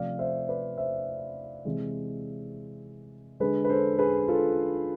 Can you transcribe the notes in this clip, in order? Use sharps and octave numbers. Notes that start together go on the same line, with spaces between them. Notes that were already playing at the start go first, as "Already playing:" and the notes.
Already playing: C3 F3 A3 D5 F5
C5 E5
B4 D5
C5 E5
C3 E3 G#3
D3 G#3 G#4 B4
B4
A4 C5
G#4 B4
F4 A4